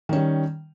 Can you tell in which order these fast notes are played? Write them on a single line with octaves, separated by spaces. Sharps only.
D#3 C#4 G3